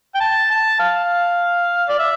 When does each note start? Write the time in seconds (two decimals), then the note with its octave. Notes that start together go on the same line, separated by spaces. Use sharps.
0.14 G5
0.20 A5
0.50 A5
0.80 F5
1.89 D5
1.99 E5